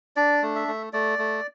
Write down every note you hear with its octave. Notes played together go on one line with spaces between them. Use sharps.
D4 D5
A3
E5
A3
A3 D5
A3